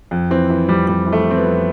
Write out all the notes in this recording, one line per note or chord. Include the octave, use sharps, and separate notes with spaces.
F2
E3 C4
E3
F2 G3
F2 G3
E3
A3
E3
C4
B3
F2